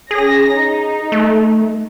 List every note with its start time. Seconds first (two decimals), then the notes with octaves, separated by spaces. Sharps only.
0.11 C#4 G#4 A#6
0.52 D#4
1.12 A3